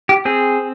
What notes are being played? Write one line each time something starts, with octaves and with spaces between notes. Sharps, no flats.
G4
C4 G#4